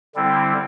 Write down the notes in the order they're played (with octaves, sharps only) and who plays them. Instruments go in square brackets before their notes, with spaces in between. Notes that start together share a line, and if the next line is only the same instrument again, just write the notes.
[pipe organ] D3 G3 C4 E4